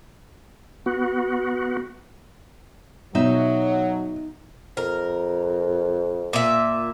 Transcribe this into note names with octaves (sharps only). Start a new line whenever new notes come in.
B3 F#4
B2 F#3 D#4 C5 E5
F2 A#4
A#2 E5